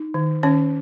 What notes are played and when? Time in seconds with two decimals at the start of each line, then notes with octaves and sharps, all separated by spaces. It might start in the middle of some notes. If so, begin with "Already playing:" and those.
Already playing: D#4
0.14 D#3
0.43 D#3 C#4 C#5